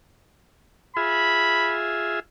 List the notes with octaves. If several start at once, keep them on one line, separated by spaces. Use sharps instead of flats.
F4 G#4 E5 B5